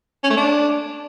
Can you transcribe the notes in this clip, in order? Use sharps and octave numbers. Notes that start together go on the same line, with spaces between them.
C#4
A3
D4